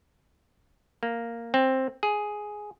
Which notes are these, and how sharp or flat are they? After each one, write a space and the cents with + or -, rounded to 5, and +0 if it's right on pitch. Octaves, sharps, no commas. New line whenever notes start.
A#3 -5
C4 +10
G#4 +5